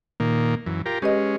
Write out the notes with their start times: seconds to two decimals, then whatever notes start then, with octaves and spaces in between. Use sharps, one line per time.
0.20 A#2 D#3 A#3
0.66 F#2 E3
0.86 F4 G4 A#4
1.02 G#3 C#4 G4 B4 D#5